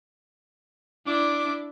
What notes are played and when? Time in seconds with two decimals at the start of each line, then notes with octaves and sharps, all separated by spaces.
1.07 D4 E4 D6